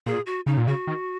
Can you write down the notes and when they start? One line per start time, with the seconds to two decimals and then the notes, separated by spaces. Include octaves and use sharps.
0.06 A#2 G#4
0.26 F#4
0.46 C#3 D#4
0.57 A#2
0.67 C#3 F#4
0.87 D#3